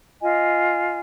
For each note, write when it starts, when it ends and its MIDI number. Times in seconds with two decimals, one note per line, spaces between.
0.21 0.99 65
0.21 0.99 75
0.21 0.99 80